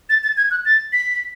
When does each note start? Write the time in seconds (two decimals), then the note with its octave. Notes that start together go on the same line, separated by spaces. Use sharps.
0.10 A6
0.24 A6
0.37 G#6
0.51 F#6
0.65 A6
0.93 B6